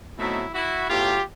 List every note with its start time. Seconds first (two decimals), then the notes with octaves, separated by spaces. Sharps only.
0.18 B2 F#3 A3 C4 D#4 E4
0.53 E4 F#4
0.90 A2 F#3 B3 F4 G4